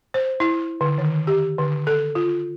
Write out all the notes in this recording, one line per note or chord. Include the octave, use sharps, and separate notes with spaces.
C5
E4
D3
D#3
G4
D3
A4
F4